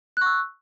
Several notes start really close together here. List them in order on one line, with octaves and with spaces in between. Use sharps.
F#6 C#6 E6